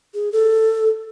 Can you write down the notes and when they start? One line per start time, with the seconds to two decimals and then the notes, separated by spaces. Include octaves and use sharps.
0.14 G#4
0.32 A4